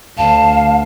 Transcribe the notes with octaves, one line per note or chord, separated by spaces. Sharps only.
D2 F5 A5